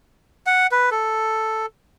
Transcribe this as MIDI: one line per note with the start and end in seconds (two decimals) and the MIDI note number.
0.47 0.67 78
0.72 0.90 71
0.91 1.66 69